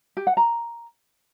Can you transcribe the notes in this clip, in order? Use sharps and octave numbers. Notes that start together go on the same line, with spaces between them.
G4
F#5
A#5